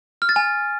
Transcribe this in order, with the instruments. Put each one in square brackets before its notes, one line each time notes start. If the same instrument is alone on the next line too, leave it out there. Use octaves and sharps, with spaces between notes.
[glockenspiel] F6
A6
G#5